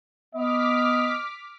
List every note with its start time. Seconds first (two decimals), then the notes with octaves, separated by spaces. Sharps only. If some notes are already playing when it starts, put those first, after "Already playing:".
0.35 B3 D#5 D6 F6 B6